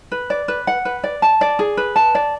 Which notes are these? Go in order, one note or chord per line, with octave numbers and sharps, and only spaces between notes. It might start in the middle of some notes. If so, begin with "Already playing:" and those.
B4
D5
B4
F#5
B4
D5
A5
D5
G#4
B4
A5
D5